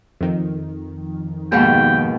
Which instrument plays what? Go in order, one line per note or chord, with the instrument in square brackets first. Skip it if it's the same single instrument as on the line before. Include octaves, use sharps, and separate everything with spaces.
[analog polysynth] F2 D#3
[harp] D#2 G#2 B2 [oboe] G5